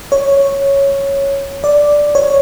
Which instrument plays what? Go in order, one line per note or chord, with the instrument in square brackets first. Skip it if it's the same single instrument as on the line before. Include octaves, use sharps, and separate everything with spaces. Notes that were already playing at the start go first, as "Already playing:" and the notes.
[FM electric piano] C#5
D5
C#5